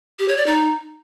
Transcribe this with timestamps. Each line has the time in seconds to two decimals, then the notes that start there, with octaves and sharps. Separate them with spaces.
0.19 G4
0.28 C#5
0.37 D5
0.46 D#4